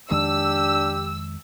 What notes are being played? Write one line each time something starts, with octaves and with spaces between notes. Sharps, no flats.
F2 D#3 G#3 D4 G4 E6